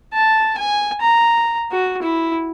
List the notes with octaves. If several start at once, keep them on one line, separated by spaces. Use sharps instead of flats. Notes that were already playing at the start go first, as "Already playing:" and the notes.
A5
G#5
A#5
F#4
E4